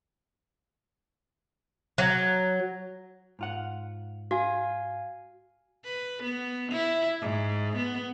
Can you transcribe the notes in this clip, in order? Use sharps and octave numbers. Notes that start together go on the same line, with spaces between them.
F#3
G#2 F4 F#5
F#4 F5 G#5
B4
B3
E4
G#2
B3